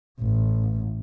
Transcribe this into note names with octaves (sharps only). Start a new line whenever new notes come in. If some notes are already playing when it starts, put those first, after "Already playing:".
A1